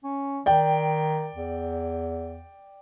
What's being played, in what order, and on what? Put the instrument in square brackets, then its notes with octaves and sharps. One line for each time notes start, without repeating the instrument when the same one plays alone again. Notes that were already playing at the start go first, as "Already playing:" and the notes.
[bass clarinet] C#4
[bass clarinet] D#3 [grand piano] D5 G5
[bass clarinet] E2